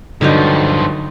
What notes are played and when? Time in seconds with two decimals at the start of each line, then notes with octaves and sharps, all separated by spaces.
0.21 G2 D3 F3 F#3 D#4